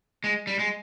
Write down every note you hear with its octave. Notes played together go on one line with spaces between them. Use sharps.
G#3
G3
G#3